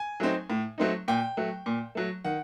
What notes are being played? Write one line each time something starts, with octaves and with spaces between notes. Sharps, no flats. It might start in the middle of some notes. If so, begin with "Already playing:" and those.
Already playing: G#5
F#3 A3 C4 D#4
A2
F#3 A3 C4 D#4
A#2 G5
F#3 A3
A#2
F#3 A3
D#3 F#5